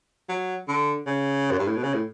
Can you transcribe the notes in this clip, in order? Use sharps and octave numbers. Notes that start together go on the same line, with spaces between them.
F#3
D3
C#3
F#2
G2
A2
B2
C#3
A2